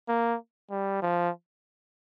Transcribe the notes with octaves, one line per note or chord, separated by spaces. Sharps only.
A#3
G3
F3